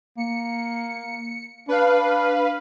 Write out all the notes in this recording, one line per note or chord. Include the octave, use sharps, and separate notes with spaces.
A#3 C#7
D4 B4 F5